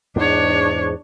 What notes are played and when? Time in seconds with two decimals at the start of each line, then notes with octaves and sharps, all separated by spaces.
0.16 E2 G#2 D4 C#5